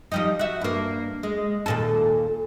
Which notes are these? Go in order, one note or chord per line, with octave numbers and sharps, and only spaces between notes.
F3 G3 D#4
F#4 E5
G2 A#3
G#3
D#2 A#2 A4